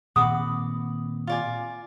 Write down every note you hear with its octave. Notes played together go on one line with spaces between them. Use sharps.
A#2 D#3 C4 F#5 B5 D6 D#6
F4 D5 G#5